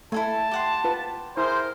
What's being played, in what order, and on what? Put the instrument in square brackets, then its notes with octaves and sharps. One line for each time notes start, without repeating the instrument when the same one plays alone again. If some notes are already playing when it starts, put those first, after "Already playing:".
[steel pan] A3 [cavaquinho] E4 A4 G#5 [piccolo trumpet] A5
[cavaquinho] G4 F#5 C6
[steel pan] F4 B4
[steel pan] E4 [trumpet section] G#4 C5 [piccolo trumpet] A#4